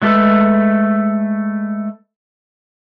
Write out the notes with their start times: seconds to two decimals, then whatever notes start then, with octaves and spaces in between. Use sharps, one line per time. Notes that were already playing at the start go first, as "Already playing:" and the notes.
0.02 F#3 G#3 A3 G4 A4 B4